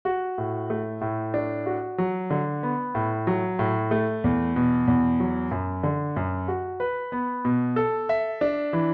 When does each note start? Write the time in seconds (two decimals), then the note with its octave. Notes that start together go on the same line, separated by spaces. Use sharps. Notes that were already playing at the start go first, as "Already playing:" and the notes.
0.05 F#4
0.38 A2
0.70 A3
1.01 A2
1.34 D4
1.66 F#4
1.98 F#3
2.30 D3
2.63 B3
2.95 A2
3.27 F#3
3.59 A2
3.91 A3
4.24 E2
4.56 B2
4.87 E2
5.20 F#3
5.51 F#2
5.83 D3
6.16 F#2
6.48 F#4
6.80 B4
7.12 B3
7.45 B2
7.76 A4
8.09 E5
8.41 D4
8.73 E3